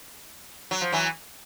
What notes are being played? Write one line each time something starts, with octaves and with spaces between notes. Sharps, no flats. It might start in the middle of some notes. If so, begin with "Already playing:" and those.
F#3
F3
E3 F#3